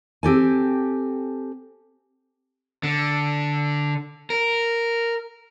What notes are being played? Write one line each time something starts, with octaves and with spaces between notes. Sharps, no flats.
C4 G4 A4 G#5
D3
A#4